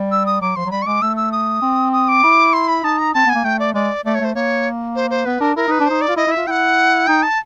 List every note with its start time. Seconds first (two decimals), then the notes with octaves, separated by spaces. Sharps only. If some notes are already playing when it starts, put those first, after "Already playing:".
Already playing: G3
0.12 E6
0.26 D#6
0.41 F#3 D6
0.56 F3 C6
0.66 F#3
0.71 G3 B5
0.82 C#6
0.86 G#3 D6
1.02 A3 E6
1.17 E6
1.32 D#6
1.62 C4
1.93 D#6
2.08 D6
2.23 E4
2.53 C6
2.68 B5
2.84 D#4 A5
2.98 A#5
3.14 C4 A5
3.26 B3 G#5
3.35 A#3
3.44 A3 G5
3.59 D5
3.74 G#3 D5
4.05 A3 D5
4.15 C#5
4.20 A3 C5
4.35 A#3 C#5
4.96 C5
5.10 C5
5.25 B3 B4
5.41 D4 A#4
5.56 E4 A#4
5.68 D#4 B4
5.80 D4
5.86 D#4 C5
6.01 D5
6.09 F4
6.16 E4 D#5
6.27 E4 E5
6.37 F4
6.47 E4 F#5 G5
7.07 D#4 G5
7.23 A5